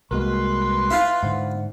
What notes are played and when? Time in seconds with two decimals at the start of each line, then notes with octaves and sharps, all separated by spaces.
0.11 C2 G#3 A#3 F#4 A#4 B4 C6
0.91 E4 F4
1.23 G#2 D3 C5 F#5